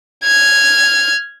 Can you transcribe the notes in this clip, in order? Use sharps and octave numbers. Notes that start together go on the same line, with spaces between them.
F6 G#6